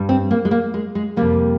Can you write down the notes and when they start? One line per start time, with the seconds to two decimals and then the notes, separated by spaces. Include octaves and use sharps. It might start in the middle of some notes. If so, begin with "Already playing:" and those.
Already playing: G2 G3
0.09 C4
0.31 A#3
0.45 G#3
0.51 A#3
0.74 G#3
0.95 G#3
1.16 F2 C3 G3 A#3